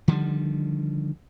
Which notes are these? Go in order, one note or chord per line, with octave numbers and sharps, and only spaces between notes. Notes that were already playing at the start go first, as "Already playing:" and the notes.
D3 D#3 F3 G3